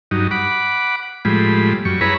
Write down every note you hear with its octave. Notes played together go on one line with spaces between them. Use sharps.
G2 F#3 D#4
F#5 B5 D6
A2 F3 G3 G#3 B5
F#2 G3 C#6
E4 G#4 B4 C#5 A#5 B5